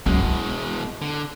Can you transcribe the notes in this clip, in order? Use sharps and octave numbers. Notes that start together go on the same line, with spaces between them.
C#2 F#2 B2 G#3
E4
D3